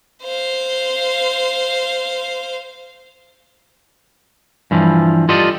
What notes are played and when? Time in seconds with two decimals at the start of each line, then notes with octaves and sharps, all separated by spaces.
0.24 C5 F5
4.71 G2 E3 F3
5.29 F4 G4 A4 D5 D#5